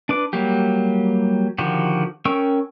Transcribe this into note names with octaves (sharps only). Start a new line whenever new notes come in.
D4 B4 D6
F#3 G3 A#3 G4
D3 D#3 F3 F#4 G4
C#4 A#4 G5 C#6 E6